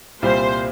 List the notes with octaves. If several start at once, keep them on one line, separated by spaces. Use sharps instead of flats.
C2 A#2 G3 C4 F4 C5